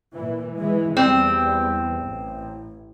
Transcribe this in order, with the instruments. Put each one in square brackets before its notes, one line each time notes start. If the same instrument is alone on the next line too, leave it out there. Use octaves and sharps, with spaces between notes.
[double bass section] A#2 E3
E3 G#3
[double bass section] E2 G3 [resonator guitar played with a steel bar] C4
[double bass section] A1